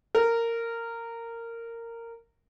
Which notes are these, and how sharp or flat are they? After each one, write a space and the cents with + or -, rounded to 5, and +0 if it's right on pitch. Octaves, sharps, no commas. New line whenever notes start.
A#4 -15